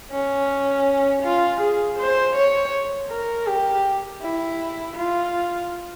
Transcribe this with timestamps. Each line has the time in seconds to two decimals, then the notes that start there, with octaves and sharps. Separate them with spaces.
0.11 C#4
1.23 F4
1.60 G#4
1.98 C5
2.36 C#5
3.10 A#4
3.47 G4
4.22 E4
4.96 F4